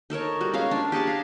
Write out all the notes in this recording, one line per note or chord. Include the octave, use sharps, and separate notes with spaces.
D#4 A4 A#4 C#5
G3 F#4
G#3 C#4 C#5 F5
D4
G4 G#4 F#5 A5
F5 A#5